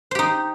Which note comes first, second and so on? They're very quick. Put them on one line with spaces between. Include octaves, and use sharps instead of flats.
C5 G4 D#4